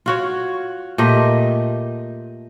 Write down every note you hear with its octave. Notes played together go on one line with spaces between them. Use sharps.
F4 F#4 C#5
A#2 A3 G4 D#5